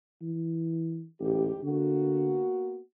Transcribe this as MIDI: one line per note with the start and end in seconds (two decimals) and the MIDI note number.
0.22 1.05 52
1.20 1.49 33
1.20 1.58 38
1.20 1.58 44
1.20 1.58 67
1.63 2.41 50
1.63 2.80 58
1.63 2.80 59
1.63 2.80 66